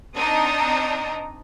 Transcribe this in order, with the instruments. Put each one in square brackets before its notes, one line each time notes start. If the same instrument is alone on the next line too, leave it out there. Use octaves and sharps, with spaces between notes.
[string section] C4 D4 D#4 [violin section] A5 A#5 D#6